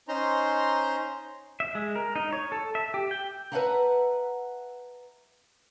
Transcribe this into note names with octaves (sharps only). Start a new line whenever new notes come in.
C#4 D#4 C5 A#5 C6
E5
G#3
A#4
D#4
C#5
A4
E5
G4
G5
B4 D#5 E5 F#5 A5 A#5